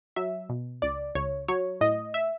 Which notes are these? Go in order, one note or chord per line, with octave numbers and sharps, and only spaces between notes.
F#3 E5
B2
C#2 D5
C#2 C#5
F#3 C#5
A2 D#5
E5